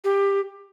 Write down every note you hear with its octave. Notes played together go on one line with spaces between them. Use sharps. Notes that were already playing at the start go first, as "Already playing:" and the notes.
G4